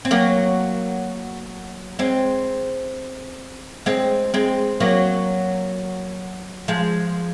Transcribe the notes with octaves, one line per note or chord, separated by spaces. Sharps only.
C4
F#3 A#3
G#3 C4
G#3 C4
G#3 C4
F#3 A#3
F3 G#3